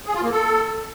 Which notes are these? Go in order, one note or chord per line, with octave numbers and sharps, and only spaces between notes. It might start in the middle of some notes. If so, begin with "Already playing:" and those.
G#4
F4
A#3
A4